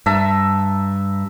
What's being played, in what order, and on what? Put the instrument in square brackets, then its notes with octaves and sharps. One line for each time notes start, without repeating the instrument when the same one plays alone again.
[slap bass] G2 [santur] E5 A5 A#5